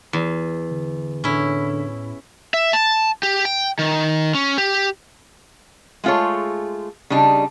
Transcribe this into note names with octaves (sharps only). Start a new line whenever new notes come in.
E2
D3
A2 D3 C#4 E4
E5
A5
G4
G5
D#3
C#4
G4
G#3 A3 F4 G#4 C#5
C#3 G3 D4 D#4